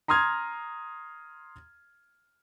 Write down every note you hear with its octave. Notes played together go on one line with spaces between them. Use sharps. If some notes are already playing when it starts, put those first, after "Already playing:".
A#5 C6 D#6 F6 G#6